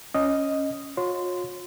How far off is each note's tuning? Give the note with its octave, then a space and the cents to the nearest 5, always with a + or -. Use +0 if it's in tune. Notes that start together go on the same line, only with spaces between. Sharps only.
C#4 +0 D#5 +0
F4 +45 C#5 -20 C6 -20